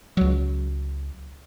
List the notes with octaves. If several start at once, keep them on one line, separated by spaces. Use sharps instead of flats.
C#2 F#3